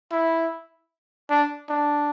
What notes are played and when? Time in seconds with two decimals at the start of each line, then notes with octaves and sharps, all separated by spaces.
0.12 E4
1.30 D4
1.69 D4